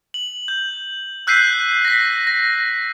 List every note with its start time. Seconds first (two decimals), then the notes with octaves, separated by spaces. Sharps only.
0.14 F#7
0.48 G6
1.27 E6 F#6 G6 B6 C7 D#7
1.85 A#6 B6
2.27 A#6